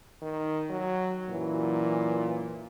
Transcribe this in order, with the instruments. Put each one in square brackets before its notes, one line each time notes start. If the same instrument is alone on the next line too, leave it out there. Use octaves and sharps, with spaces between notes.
[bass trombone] D#3
F#3
[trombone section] F#2 E3 F#3 [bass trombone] A#2